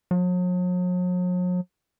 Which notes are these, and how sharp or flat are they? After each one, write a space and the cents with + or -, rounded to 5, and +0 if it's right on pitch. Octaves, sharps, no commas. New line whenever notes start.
F#3 -45